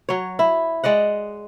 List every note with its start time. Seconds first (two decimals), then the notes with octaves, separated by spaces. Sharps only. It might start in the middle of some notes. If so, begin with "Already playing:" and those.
0.09 F#3 C#5
0.39 E4
0.84 G#3 D5 D#5 F#5